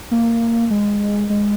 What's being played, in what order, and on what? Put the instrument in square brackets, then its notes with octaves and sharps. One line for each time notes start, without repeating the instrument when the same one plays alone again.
[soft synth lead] A#3
G#3
G#3